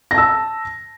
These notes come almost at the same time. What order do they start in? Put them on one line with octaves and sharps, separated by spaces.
A#6 A5 E6